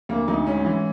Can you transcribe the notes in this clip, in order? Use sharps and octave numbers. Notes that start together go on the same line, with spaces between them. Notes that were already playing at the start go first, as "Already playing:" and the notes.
D2 A#3
D2 D#4
G#2 C#4
E3